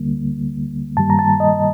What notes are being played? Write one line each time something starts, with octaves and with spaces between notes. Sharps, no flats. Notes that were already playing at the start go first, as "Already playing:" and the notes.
Already playing: D2 D3 G3 A#3
G2 D#3 G3 A#3 A5
A#5
A5
D#5